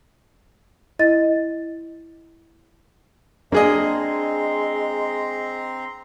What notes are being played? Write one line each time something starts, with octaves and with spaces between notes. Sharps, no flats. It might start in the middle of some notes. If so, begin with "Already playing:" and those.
E4 D#5 A6
G#3 A#3 C4 D4 G#4 D#5 A#5 C6